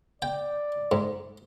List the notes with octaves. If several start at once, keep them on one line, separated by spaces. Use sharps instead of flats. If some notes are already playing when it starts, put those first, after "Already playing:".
D5 G5
G#2